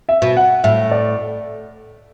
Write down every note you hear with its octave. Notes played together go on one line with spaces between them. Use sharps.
E5
B2
F#5
A2 E5
D5